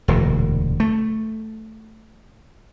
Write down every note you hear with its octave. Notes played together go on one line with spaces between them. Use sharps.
E1 D2 A#2
A3